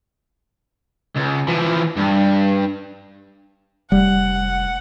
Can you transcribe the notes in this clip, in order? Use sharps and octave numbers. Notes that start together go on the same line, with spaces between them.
C#2
E3 F3
G2
F1 G3 F#5